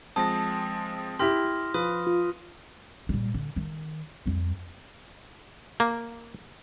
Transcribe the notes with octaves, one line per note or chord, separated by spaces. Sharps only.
F3 G#3 C4 A5 D#6 A#6
E4 G4 C6 F6 A#6
F3 B4 D#6
F4
A#2 G3
D3
D#3
F2 G3
A#3